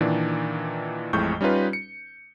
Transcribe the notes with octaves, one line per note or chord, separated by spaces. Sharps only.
A#2 D#3 E3 D4
A1 F2 A2 G#3 C#6 G6
G3 C#4 D#4 F4 B4
C#7